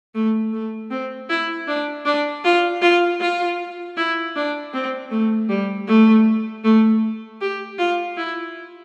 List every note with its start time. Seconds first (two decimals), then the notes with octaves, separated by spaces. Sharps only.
0.15 A3
0.53 A3
0.91 C4
1.29 E4
1.68 D4
2.05 D4
2.44 F4
2.82 F4
3.20 F4
3.97 E4
4.36 D4
4.74 C4
5.11 A3
5.49 G3
5.88 A3
6.64 A3
7.41 G4
7.78 F4
8.17 E4